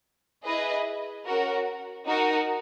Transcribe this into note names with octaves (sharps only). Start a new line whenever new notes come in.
E4 G#4 B4 D#5
C#4 F#4 A#4
D#4 F#4 A#4